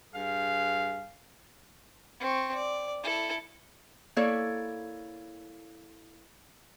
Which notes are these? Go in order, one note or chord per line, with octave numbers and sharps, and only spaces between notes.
G2 G#4 F5
C4 C#6
D5
E4 A4
A#3 E4 A4 C#5 D5